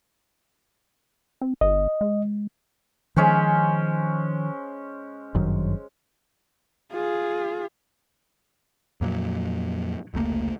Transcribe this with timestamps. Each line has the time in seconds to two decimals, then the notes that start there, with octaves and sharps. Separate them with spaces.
1.41 C4
1.61 G1 D#5
2.01 G#3
3.16 D#3 F3 G#3 C#4 C5
5.34 G1 F#2 D#3
6.93 F4 G#4
9.01 F2 A#2 F#3
10.14 F1 C#2 A3 A#3